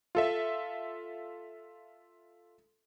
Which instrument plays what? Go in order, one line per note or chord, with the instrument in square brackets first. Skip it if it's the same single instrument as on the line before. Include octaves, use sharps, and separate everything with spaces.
[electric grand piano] F4 A4 E5